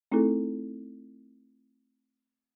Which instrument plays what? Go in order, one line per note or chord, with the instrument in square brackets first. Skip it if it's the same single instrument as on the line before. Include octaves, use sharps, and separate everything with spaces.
[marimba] A3 C4 D#4 E4 G#4 A4